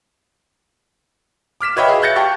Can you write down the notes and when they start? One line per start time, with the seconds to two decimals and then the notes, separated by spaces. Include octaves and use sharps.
1.61 D6 F6 B6 E7
1.76 F#4 B4 C#5 D#5 E5 G5
1.88 G#4 F5
2.02 E5 F#6 G6 A6 A#6 C#7
2.16 G4 F5 G5 A5 C#6